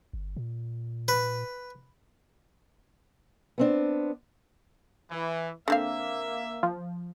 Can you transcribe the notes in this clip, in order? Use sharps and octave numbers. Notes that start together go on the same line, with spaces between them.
G1
A#2
B4
B3 C4 D4
E3
D3 A#3 C4 E5 F5
F3